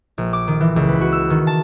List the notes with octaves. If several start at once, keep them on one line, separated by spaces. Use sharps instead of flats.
A#1
D6
D#3
E3
C#2
B4
F#4
E6
D#3
A5